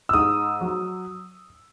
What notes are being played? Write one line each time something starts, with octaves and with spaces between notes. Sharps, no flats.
E6
G#2 D#6
F#3